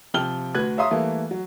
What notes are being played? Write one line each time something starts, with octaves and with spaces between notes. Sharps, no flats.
C3 F3 G5 F6 G7
D2 F#4 B4 F#6 G#6
C#5 E5 F5 A#5 C6 D#6
E3 G3 A3 A#3
F#3